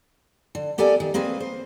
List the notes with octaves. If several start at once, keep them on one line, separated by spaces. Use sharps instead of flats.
D3
B3 G4 A4 A#4 D5 G#5
D#3
A#3 C4 G#4 B4
C5